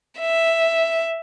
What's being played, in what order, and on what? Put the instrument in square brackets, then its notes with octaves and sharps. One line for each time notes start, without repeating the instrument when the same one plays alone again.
[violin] E5